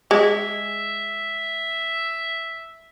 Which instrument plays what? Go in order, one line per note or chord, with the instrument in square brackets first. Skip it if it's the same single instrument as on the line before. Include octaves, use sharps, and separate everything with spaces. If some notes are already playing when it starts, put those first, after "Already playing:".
[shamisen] G#3 [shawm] E5